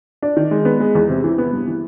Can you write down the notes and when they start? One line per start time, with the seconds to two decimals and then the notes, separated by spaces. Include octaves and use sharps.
0.22 D4
0.37 D#3
0.51 G#3
0.65 B3
0.80 G#3
0.95 E2
1.09 C3
1.24 E3
1.38 B3
1.53 G2
1.67 E3